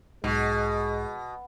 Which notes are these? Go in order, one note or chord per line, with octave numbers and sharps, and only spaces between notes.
B1 G#2 B2 G#3